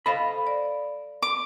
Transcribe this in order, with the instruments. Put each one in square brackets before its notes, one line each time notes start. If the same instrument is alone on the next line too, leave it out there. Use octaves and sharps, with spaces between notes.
[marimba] A4 C5 F5 [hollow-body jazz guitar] D#5 B5
[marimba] D5
[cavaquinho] D6